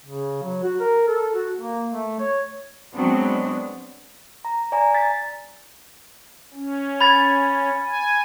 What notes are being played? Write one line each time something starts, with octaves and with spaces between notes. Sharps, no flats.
C#3
F#3
F#4
A#4
A4
F#4
A#3
A3
C#5
F#3 G#3 B3 C4 D4
A#5
D5 G#5 A#5
A6 B6
C#4
B5 G#6 A6
G#5